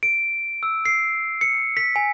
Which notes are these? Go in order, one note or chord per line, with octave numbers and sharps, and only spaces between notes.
D7
E6
C7
C#7
B6
G#5